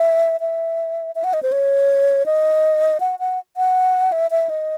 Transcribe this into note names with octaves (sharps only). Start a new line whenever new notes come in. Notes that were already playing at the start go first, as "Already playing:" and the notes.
Already playing: E5
E5
E5
F#5
D#5
C5
C#5
D#5
F#5
F#5
F#5
E5
E5
D#5